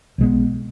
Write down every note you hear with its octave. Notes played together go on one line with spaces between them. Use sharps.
B1 B2 G#3 B3